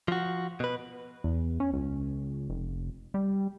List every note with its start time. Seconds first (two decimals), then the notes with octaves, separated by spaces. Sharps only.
0.08 F3 F#4
0.60 B2 B4
1.24 E2
1.60 C#4
1.73 C#2
2.49 F1
3.14 G3